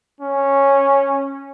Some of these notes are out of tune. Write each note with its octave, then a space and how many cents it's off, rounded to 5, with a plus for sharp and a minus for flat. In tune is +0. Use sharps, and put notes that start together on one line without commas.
C#4 -5